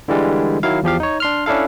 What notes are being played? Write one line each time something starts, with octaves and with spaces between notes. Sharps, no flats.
D3 E3 G3 G#3
D#3 F#3 E4 F5
E2 F3 G4 F5
D#4 C#5
D4 C6 F6
C#4 D4 E4 A4 F5